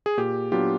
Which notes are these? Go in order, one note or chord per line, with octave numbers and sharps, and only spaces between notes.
G#4
A#2 G4
F#3 B3 D4 F4 G4